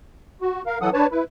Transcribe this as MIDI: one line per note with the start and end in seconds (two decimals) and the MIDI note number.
0.41 0.62 66
0.66 0.79 70
0.66 0.79 77
0.81 0.90 52
0.81 0.90 54
0.81 0.90 69
0.81 0.90 78
0.81 0.90 87
0.93 1.07 62
0.93 1.07 71
0.93 1.07 73
0.93 1.07 81
1.11 1.24 64
1.11 1.24 71